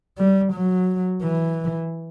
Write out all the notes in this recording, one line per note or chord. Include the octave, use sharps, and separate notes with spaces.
G3
F#3
E3